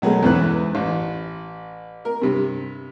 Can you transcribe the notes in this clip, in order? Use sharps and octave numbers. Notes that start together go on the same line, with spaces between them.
B2 F#3 G#3 A3
E2 G#2 C#4 E4 B4 F#6
A1
A#4
G2 C3